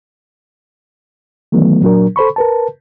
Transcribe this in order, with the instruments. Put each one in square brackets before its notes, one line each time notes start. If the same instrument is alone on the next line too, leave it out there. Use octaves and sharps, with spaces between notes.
[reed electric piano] D#3 E3 F#3 A3 B3
A#2 F#3 D4 A#4
A4 C5 B5 C#6
A#4 B4 A5